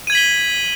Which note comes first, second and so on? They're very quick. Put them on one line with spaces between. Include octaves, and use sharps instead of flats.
D#7 G#6 F#7 B6 G7